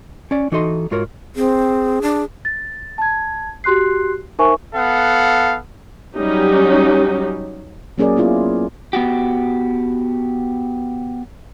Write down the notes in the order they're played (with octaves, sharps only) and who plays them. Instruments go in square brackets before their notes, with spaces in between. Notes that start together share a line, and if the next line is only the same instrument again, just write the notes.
[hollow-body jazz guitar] C#4 D5
E3 D#4 F#4 A4 D#5 C6
G#2 F4 F#4 A#4 C#5
[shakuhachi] C4 [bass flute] G#4
[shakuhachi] D4
[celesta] A6
A5 G#6
F#4 G4 C6 F#6 C7
D#4 A#4 C5 E5 G#5 C#6
[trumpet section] B3 A4 F5 F#5
[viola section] F#3 G3 C#4 D#4 G4
[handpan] F#3 A#3 C#4 G#4 A#4 D5
A#3 B3 E4 F4 G#4
[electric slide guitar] B3 F#4 G4